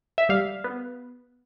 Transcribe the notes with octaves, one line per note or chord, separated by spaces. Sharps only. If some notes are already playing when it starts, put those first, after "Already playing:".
E5
G3 F5
B3